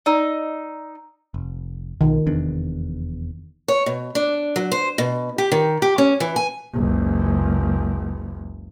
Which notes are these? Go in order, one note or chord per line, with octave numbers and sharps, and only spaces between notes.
D#4 D5 E6
F1
B1 D#3
F1 E2 D4
C#5
B2
D4
F#3
C5
B2
G4
D#3
G4
C#4
E3
G#5
F#1 C#2